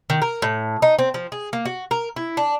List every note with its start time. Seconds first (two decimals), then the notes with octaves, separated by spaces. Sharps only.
0.10 D#3
0.22 A#4
0.42 A2
0.82 D#4
0.99 C4
1.14 F3
1.32 G#4
1.53 A#3
1.65 F#4
1.91 A#4
2.16 E4
2.37 D4